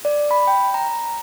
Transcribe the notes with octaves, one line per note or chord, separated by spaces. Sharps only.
D5
B5
G5
A#5